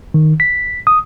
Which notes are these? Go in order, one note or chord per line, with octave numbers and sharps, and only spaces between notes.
D#3
B6
D#6